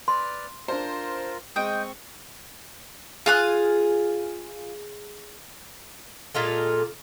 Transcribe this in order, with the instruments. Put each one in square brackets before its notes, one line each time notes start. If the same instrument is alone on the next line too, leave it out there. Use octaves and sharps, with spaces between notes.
[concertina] B4 D5 F6 [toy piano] C6
[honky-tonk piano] D4 C5 [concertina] F4 A#4
[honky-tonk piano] G#3 [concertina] C4 C#6 [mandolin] D#5 G5
[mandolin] F4 F5 F#6 [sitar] G#4
[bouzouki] A#2 G#3 F4 A4